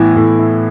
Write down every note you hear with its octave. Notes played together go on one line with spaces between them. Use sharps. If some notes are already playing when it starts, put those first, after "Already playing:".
Already playing: A2 E3 B3 E4
A2
E4